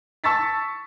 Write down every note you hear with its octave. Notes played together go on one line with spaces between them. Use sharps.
A5 C#6 E6 A6 B6